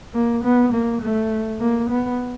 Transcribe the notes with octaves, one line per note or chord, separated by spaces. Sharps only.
A#3
B3
A#3
A3
A#3
B3